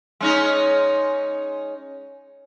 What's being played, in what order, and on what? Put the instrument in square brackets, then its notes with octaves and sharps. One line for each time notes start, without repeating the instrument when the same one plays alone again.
[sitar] G#3 C#4 D#4